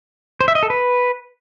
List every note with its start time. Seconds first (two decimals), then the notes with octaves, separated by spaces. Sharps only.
0.41 C5
0.48 E5
0.55 D#5
0.63 A4
0.70 B4